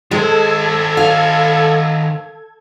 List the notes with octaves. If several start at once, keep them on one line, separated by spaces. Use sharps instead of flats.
D#3 G#3 A4 C5 G#6
F5